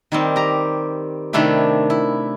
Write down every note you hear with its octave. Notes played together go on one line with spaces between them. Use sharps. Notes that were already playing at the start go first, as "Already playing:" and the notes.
D#3 G3 C4
G4 A#5
C3 D#3 A3 D4 E4 G4
E4